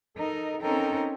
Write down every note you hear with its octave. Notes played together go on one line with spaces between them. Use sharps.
D#4 A4 A#4 D#5
C4 C#4 D#4 A4 A#4 G5